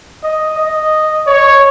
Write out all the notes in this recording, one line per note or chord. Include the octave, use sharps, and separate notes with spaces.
D#5
D#5
C#5